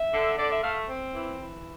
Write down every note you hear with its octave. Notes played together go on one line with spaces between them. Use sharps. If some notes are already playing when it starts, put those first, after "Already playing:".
Already playing: E5
D3
D3 D5
E5
A3 F5
C4
E3
E3